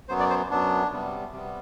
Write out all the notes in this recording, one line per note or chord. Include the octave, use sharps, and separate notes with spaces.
F#2 F#3 B3 C5
D5
C5
F#2 F#3 B3 D4
C3 G3 B3
C3 G3 B3